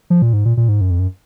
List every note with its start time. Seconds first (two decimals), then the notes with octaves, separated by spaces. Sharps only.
0.10 F3
0.22 A#2
0.33 G#2
0.45 A#2
0.57 A#2
0.69 G#2
0.81 F#2
0.91 F2
0.99 F#2